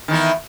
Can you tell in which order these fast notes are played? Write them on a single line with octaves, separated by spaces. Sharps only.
D#3 E3 B3